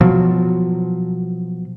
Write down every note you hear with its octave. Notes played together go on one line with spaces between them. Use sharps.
B2 F3 F#3